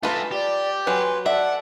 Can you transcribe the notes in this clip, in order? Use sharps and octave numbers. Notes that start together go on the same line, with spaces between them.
A3 D#4 F4 B4 G#5 A5
G4 D5
F#3 B4 G#5 C6
A4 D5 E5 F#5